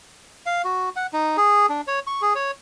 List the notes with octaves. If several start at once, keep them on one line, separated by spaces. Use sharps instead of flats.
F5
F#4
F#5
D#4
G#4
D4
C#5
C#6
G#4
C#5